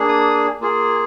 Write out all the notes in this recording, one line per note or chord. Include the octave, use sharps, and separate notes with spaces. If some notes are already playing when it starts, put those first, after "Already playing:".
Already playing: A#3 D4 G#4
D#6
A#3 F4 G#4